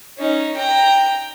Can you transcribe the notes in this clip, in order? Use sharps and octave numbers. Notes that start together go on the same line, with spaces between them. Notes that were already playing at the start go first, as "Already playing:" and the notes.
C#4 D#4
G5 A#5